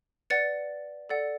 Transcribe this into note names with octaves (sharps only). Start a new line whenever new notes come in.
B4 D5 F#5 A6 C#7
A4 D5 F#5